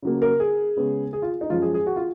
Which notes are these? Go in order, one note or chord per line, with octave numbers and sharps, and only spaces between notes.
C#3 F#3 A#3
A#4
G#4
C#3 G#3 B3
G#4
F4
D#4
F#2 F3 G#3 F4
G#4
G#4
F#4
F4